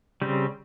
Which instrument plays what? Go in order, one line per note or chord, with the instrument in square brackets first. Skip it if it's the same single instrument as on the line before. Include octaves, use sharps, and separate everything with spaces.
[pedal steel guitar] C#3 G3 C4